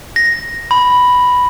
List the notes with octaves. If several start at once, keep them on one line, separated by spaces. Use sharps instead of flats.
A#6
B5